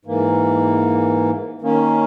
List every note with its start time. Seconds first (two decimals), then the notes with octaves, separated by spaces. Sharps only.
0.05 G#2 E3 A#3
1.61 D#3 A#3 C#4